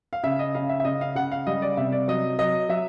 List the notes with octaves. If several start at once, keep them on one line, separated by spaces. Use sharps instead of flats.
F5
C#3 E5
D#5
C#3 F5
E5
E5
C#3 D#5
F5
C#3 F#5
F5
G3 D#5
D5
C3 E5
D5
F#3 D#5
F#3 D#5
F#3 E5